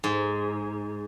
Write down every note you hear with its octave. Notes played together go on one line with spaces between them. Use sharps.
G#2